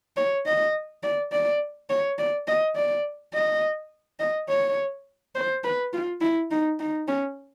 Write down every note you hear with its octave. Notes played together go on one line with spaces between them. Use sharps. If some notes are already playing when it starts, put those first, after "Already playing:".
C#5
D#5
D5
D5
C#5
D5
D#5
D5
D#5
D#5
C#5
C5
B4
F4
E4
D#4
D#4
C#4